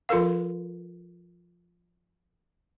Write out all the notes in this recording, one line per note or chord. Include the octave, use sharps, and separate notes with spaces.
F3 F4 A4 A#4 F5